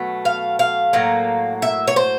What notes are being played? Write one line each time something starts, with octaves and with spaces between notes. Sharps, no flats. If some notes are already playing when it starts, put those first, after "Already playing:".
Already playing: B2 F#3 A3
F5
F5
A2 F#3 A#3
E5
C#5
C5